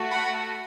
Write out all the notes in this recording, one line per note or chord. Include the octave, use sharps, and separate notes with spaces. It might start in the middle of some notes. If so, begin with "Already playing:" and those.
Already playing: A3 F#4 A4
F#5 B5